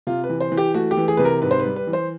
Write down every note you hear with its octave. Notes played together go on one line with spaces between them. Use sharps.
C3 F4
B4
E3
C5
E3
G4
A3 F#4
G4
E3
G#4
C3 B4
A#4
G#2 B4
C5
B4
G3
B4
E3
C5